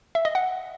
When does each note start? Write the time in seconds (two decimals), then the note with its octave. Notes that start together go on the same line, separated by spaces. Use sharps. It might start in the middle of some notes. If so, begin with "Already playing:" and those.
0.15 E5
0.25 D#5
0.35 F#5